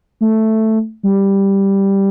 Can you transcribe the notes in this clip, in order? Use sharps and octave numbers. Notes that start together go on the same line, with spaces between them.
A3
G3